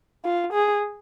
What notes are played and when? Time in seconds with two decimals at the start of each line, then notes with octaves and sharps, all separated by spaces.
0.25 F4
0.53 G#4